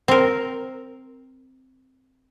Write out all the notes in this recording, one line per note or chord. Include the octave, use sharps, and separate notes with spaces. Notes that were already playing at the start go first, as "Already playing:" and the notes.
C4 A#4